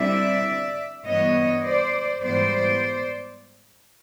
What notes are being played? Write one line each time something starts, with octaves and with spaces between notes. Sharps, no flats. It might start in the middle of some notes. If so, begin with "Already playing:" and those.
Already playing: D3 G3 C4 E4 D5 E5
G2 E3 G3 B3 C#5 D#5
C5 D5
G#2 E3 G3 B3 C5 D5